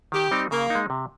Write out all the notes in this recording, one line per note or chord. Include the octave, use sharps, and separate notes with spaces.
D#3 G4
G3 C4 D#4
C#3 A#3
D#4
G#3
C3